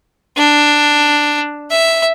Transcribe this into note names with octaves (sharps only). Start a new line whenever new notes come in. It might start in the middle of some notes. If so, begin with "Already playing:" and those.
D4
E5